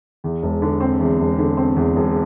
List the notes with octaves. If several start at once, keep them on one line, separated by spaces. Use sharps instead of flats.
E2
E1
D3
C4
E2
E1
D3
C4
E2
E1